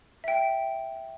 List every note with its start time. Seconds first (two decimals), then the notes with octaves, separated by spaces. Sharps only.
0.24 E5 G5